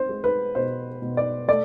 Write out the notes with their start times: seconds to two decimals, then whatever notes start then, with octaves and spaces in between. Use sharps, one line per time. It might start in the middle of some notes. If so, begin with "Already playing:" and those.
Already playing: C4 C5
0.09 G#3
0.24 B4
0.55 B2 C5
1.02 B2
1.17 D5
1.48 A3 D5